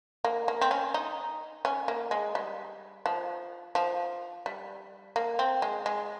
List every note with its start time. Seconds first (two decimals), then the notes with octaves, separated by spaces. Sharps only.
0.24 A#3
0.48 A#3
0.61 C4
0.71 C#4
0.94 D#4
1.65 C#4
1.88 A#3
2.11 G#3
2.35 G3
3.06 F3
3.75 F3
4.46 G3
5.16 A#3
5.39 C4
5.62 G#3
5.86 G#3